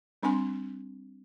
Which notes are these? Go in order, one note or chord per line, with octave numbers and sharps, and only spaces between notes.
G3 C4 D4 G#5 C6